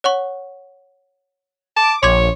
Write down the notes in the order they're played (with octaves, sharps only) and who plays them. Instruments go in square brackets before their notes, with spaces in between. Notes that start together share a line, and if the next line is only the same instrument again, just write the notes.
[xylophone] C#5 F#5 C#6
[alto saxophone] A5 [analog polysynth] D6
[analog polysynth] A#1 [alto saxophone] C#5 [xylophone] C6 D6 G#6